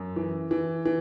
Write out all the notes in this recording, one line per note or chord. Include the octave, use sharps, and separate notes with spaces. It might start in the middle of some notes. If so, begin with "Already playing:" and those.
Already playing: F#2
E3
E3
E3